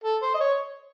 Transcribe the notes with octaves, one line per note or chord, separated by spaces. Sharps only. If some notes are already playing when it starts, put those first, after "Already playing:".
A4
C5
D#5
C#5